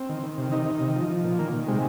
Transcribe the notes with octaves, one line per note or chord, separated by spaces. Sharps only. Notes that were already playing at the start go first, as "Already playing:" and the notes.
Already playing: C4
D#3
D#3
C3
D#3 D#4
D#3
C3
F3
F3
A#2
D#3 A#3
D#3
C3 G#3